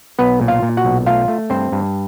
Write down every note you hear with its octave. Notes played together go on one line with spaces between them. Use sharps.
B1 B3 B4
A#2
F4 F5
A#2
F#4 F#5
B1
A3 F4 F5
A3
G2 C4 C5
G2